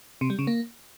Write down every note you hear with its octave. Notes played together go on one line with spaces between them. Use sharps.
C3
G3
C#3
A#3